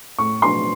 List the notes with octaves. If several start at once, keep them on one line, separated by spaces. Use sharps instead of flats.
A2 C#6
F#3 B3 D4 C6